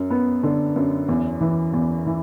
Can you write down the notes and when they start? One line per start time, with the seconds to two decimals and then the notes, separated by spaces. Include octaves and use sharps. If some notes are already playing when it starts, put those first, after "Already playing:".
Already playing: F#2
0.10 B3
0.43 D3
0.76 F#2
1.09 E2
1.41 E3
1.74 E2
2.06 E3